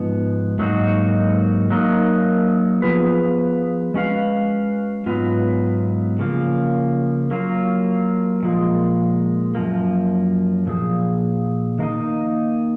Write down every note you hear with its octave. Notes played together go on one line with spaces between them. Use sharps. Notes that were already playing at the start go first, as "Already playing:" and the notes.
Already playing: G#2 F3 B3
G#2 F#3 A#3 D#4 F#4
F#3 A#3 D#4 A#4
F3 B3 F4 G#4 B4
G#3 C#4 F#4 B4 F5
G#2 F#3 B3 F4 B4
C#3 F3 A#3
F#3 A#3 F4
A#2 F3 G#3
F#2 F3 A#3
A#2 F3 G#4
D#3 A#3 D#4